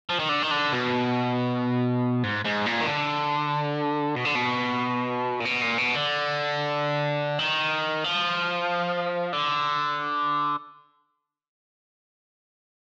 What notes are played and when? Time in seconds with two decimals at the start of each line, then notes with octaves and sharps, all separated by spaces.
0.10 F3
0.20 D#3
0.29 D3
0.43 D#3
0.51 D3
0.72 B2
2.24 G#2
2.45 G#2
2.67 A#2
2.81 D#3
2.87 D3
4.16 B2
4.25 D3
4.36 B2
5.40 A#2
5.45 B2
5.61 A#2
5.78 B2
5.95 D3
7.39 D#3
8.04 F3
9.33 D3